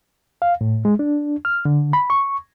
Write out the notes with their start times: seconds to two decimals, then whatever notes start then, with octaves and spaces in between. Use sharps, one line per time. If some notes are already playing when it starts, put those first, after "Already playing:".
0.42 F5
0.61 A2
0.85 G#3
0.99 D4
1.45 F6
1.65 D3
1.93 B5
2.10 C#6